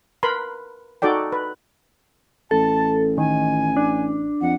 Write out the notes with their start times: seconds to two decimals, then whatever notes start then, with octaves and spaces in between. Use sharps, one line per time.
0.23 A#4 B4 B5 C6
1.02 D#4 F#4 A4 D5 G5
1.32 B4
2.51 A1 A4 A5
3.18 D#3 G#5
3.77 D4
4.41 F2 F#5